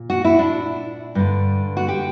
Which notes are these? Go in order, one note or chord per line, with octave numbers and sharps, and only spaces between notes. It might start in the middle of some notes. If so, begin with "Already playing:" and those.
Already playing: A#2
F#4
E4
D4
G2 D3
F#4
G4